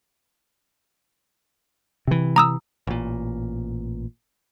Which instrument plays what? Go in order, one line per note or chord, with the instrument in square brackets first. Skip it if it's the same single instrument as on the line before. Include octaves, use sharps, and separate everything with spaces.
[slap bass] C3 E3
[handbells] A#5 D#6 E6
[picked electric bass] A1 A#2